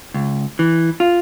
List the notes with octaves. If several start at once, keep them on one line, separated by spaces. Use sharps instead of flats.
C#2
E3
F4